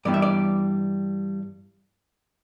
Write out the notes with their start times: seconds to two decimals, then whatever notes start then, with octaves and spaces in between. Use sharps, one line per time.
0.05 G2 E3 G3 B3 D5
0.14 E5
0.22 D5